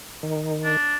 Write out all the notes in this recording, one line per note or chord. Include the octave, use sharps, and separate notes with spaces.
D#3
D4